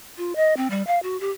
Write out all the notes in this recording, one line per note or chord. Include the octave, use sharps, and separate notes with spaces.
F4
D#5
C4
G3
F5
F#4
G4